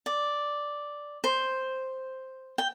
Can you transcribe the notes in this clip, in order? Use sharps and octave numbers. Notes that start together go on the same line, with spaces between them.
D5
C5
G5